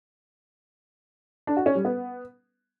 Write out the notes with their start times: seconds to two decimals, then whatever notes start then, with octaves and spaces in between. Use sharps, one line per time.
1.47 D4
1.57 F#4
1.66 C#4
1.75 G3
1.85 B3